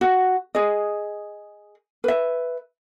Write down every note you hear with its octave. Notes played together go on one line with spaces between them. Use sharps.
F#4
G#4 D#5
B4 E5